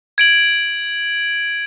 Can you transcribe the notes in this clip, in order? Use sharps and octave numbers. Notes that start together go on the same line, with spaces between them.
G#6 D7 F#7